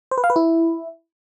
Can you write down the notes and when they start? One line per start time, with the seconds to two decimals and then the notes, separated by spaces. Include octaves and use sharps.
0.11 C5
0.18 B4
0.24 F5
0.30 B4
0.36 E4